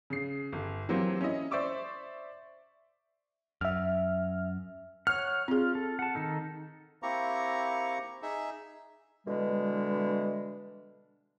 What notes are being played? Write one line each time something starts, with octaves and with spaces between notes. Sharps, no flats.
C#3 C7
G1
E3 F#3 A#3 C4 G4 C5
C#4 E4 D#5
C5 D5 E5 C#6 D6 E6
F#2 E5 F6
C#5 F#5 F6
C4 F4 G#4
A4
F#5 A5
D#3 D#4 A4
A#3 C4 E4 G4 A#5 C#6
D#4 G#4 E5
B2 D3 E3 G3 G#3 D4